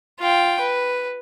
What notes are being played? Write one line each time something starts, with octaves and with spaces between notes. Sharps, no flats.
F4 G5
B4